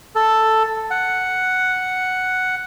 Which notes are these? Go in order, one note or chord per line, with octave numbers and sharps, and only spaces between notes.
A4
F#5